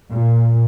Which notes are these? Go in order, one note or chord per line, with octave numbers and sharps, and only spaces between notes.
A#2